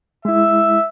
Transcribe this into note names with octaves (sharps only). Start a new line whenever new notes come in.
G#3 E4 E5